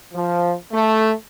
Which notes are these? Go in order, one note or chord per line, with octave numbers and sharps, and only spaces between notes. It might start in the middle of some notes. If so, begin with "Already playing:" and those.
F3
A3